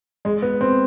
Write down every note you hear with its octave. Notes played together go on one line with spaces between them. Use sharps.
G#3
B3
C4